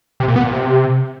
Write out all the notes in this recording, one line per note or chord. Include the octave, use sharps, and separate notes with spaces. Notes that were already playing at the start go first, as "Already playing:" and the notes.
C3
A#2
B3
A#2
C3